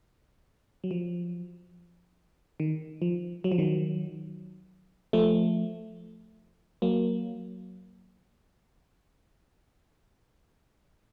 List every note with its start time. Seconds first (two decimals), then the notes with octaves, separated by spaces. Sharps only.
0.84 F#3
0.91 F3
2.60 D#3
3.02 F3
3.44 F#3
3.52 F3
3.58 D#3 F#3
5.13 F3 A3
6.82 F#3 A#3